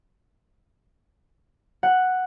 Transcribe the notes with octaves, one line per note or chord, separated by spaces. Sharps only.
F#5